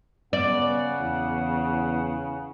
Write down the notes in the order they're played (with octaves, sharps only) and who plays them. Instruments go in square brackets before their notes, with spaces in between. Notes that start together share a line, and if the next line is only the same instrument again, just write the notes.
[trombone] C#3 [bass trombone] B3 [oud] D5 [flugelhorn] F#5
[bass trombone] E2